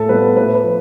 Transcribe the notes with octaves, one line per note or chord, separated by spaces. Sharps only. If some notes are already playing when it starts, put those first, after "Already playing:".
Already playing: A2 A4
G3 B3 F4 B4
A2 B4
B4
F3